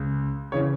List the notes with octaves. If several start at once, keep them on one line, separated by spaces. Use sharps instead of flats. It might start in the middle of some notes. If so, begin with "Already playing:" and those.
Already playing: C#2 C#3
C#3 E3 C#5